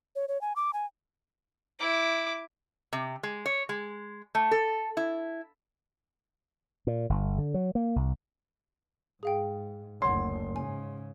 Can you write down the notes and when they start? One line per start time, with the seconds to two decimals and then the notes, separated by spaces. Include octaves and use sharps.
0.16 C#5
0.28 C#5
0.41 G#5
0.56 D6
0.73 G#5
1.79 E4 D6
2.93 C3
3.23 G#3
3.46 C#5
3.69 G#3
4.35 A3
4.51 A4
4.97 E4
6.87 A#2
7.10 G1
7.38 D3
7.54 F#3
7.75 A#3
7.96 C2
9.23 G#2 G#4 F5 G5
10.02 F#1 D2 C#5 F#5 C6
10.56 G#2 C#3 G#5